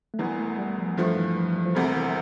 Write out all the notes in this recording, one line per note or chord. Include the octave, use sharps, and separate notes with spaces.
A3
E1 E2 E3 G3
A3
G3
F3
G2 E3 F3 A3
E3
F3
G3
F3
E1 D2 C3 G3
E3